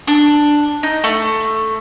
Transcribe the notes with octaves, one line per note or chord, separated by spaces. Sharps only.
D4
D#4
A3